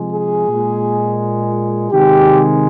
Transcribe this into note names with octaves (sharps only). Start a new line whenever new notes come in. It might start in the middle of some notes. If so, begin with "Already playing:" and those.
Already playing: C3 F3 G#3
G#4
A#2 G#3
C3 D#3 G#3 G4